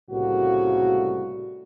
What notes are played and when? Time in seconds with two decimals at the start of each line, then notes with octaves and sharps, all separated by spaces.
0.11 C2 A2 C#3 A3 A#3 F#4